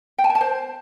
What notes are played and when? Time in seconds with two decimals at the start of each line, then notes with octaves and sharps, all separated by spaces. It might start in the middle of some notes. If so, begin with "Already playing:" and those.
0.18 G5
0.24 A5
0.30 G#5
0.35 A5
0.41 C5